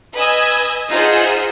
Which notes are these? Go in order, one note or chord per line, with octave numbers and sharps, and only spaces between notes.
B4 D#5 G#5 D#6 E6 G#6
D#4 F4 G#4 C5 E5 F#5